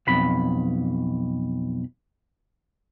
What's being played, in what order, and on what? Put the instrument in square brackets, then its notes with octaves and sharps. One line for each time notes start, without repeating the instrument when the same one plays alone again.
[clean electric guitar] B1 F2 B5